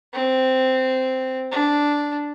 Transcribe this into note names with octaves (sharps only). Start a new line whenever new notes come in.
C4
D4